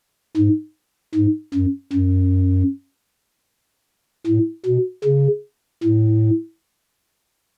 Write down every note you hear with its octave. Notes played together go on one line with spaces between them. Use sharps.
G#2
G#2
F#2
F#2
A2
B2
C#3
A2